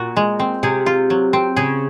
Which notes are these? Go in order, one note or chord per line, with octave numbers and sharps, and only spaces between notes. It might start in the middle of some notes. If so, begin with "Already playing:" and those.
Already playing: A#2 F#4
G#3
C4
C3 G#4
F4
F#3
C4
C#3 G#4